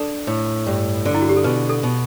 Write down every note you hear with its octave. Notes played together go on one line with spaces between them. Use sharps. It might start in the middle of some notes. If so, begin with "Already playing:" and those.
Already playing: D4 A4
A2
G2
D3
E4
F#4
G4
A4
B2 B4
A4
B2